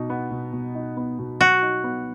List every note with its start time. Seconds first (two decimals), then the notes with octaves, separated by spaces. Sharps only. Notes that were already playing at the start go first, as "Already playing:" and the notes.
Already playing: B2 D#4
0.10 B3
0.31 B2
0.53 B2
0.75 D#4
0.97 B3
1.19 B2
1.41 F#3 F#4
1.62 D#4
1.84 B3